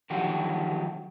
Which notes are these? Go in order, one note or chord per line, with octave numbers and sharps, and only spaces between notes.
D3 D#3 F3 F#3 F#4 G4